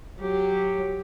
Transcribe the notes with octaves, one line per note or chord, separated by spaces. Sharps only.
F#3 G4